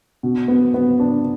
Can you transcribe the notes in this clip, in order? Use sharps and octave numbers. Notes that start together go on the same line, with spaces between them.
B2
B3
B3
D4